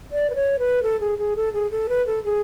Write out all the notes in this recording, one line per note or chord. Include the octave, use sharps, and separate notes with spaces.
D5
B4
C#5
B4
A4
G#4
G#4
A4
G#4
A4
B4
A4
G#4